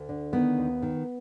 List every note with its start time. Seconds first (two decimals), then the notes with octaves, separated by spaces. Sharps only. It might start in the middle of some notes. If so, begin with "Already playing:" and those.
Already playing: D2
0.09 D3
0.33 D#3 B3
0.58 D#2
0.82 D#3